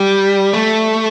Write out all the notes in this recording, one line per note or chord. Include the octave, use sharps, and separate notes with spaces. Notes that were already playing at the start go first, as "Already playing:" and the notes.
Already playing: G3
A3